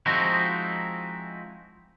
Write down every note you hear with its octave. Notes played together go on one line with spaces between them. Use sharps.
F3 G#3 C4 D#4 E4 F#4